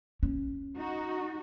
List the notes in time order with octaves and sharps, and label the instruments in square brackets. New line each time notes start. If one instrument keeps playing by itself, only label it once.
[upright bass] C#4
[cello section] D#4 F#4